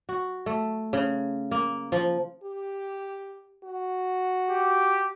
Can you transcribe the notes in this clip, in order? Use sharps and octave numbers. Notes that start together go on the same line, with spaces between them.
F#4
A3
C#3
A#3
F3
G4
F#4
G4